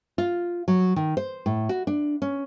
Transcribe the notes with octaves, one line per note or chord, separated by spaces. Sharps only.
F4
F#3
D#3
C5
A2
F#4
D4
C#4